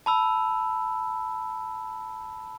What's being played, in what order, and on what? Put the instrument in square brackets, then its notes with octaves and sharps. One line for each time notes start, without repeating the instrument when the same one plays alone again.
[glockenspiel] A5 B5 E6